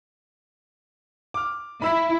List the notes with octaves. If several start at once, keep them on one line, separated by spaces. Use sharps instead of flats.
D6 F6
E4 B5 E6 B6